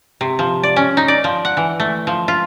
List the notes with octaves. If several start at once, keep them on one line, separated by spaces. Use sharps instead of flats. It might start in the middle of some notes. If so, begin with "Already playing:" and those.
C3
F3
D5
C#4
D#4
D5
F3
F#5
E3
A3
F3
F4